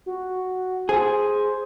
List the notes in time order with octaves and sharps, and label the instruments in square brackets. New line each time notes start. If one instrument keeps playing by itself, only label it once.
[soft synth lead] F#4
[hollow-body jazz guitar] G#4 [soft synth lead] C5